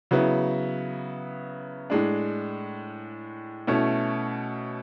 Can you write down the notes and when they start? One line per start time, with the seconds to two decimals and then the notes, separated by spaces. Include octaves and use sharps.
0.11 C#3 F#3 B3 E4
1.90 A2 G#3 D4
3.67 B2 A3 C#4 E4